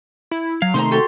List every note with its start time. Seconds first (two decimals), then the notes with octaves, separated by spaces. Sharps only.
0.31 E4
0.62 F#3 F5
0.74 C3 D#3 A3 D#4 C5 A#5 C6
0.91 F#4 G4 A4